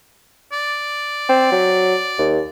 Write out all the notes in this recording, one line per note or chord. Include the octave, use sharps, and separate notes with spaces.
D5
C4
F#3
D#2